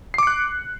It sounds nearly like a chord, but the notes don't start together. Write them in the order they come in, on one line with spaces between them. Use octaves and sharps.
C7 D6 C#7 F#6